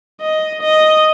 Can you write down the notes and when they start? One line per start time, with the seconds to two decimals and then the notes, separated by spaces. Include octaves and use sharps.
0.21 D#5
0.62 D#5